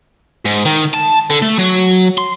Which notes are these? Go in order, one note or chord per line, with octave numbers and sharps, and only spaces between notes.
G#2
D#3
A5
D3
A3
F#3
C6